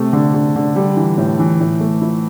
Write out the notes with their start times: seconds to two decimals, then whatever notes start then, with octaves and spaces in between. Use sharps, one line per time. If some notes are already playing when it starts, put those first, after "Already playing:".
Already playing: C3 A3
0.13 D3
0.34 D3
0.56 D3
0.76 G3
0.97 E3
1.18 A2
1.39 E3
1.60 A2
1.80 A3
2.01 E4